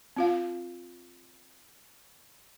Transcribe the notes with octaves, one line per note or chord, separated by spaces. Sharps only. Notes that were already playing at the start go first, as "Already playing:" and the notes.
C4 F4 F5